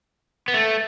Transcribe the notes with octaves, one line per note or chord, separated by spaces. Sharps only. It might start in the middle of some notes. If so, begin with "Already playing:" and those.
B3
A3